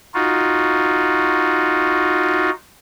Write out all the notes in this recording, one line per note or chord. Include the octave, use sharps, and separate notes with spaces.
D#4 F4 F#4